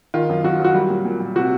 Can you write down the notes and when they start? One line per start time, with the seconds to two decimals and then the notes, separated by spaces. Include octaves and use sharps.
0.14 D#3 F4
0.29 F#2
0.44 F#2 F#4
0.60 F#3 F#4
0.75 G3
0.90 A#2
1.05 A#2
1.20 A#2
1.36 C3 F#4